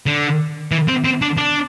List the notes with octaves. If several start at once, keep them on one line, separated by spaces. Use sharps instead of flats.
D3
E3
C4
C4
D4
D4